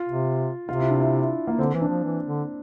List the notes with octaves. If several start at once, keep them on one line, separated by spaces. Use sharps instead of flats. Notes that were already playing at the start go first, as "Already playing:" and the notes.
Already playing: F4
C3
C3 F4
E4
D4
E4
A#3
D3 C4
E3
D4
F3
E3
D3